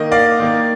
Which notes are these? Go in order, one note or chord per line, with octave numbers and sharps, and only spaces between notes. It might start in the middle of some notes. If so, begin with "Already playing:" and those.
Already playing: D#3 A#3 D#5
D5 F5
D#3 A#3